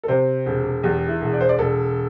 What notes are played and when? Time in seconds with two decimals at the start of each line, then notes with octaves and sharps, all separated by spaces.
0.03 A4
0.08 C3 C5
0.46 E1
0.83 E2 G4
1.08 E4
1.21 E1
1.33 D5
1.41 C5
1.49 D5
1.58 E1 A4